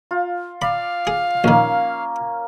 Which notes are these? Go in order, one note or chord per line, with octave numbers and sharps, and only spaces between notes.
F4
D5 F5 B5
G#4
A#1 D#3 A#3 C#4